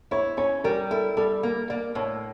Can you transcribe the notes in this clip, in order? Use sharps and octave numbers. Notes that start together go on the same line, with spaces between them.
E4 C#5
C#4 C#5
G3 A#4
E4 A4
G3 A4
A#3 A#4
A#3 D5
A2 C#5